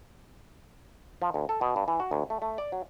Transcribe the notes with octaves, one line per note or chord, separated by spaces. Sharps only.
F3
D2
A4
B2
G2
E3
F#4
D2
A3
A3
D5
F#3